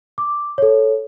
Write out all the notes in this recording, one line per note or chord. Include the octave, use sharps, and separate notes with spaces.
D6
A4 C#5